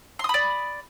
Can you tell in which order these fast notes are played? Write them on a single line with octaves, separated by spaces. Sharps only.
C6 D#6 B5 D5